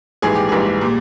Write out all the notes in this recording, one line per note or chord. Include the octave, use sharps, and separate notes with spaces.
A#1 G#2 E3 G3 G#4
G4
A#1 G#2 E3 G3 G#4
A#2 G3